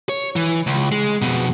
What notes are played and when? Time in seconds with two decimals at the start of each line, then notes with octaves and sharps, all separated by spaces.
0.09 C#5
0.36 E3
0.67 C#2
0.92 G#3
1.22 F2 B2